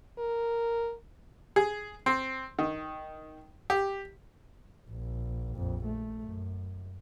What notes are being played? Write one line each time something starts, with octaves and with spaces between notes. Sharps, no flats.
A#4
G#4
C4
D#3
G4
A#1
A#1 F2
A3
F#2